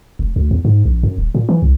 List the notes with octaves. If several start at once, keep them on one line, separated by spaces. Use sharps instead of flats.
F1
D2
E2
G#2
A#1
F#2
D#1
A#2
E3
C2